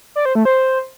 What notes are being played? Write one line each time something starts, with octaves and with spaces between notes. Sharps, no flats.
D5
C5
A3
C5